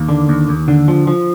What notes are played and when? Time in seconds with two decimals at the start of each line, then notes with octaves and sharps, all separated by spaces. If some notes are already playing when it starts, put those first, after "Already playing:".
Already playing: D#2 A#3
0.09 D3
0.29 D#2
0.49 D#2
0.68 D3
0.88 F3
1.07 F3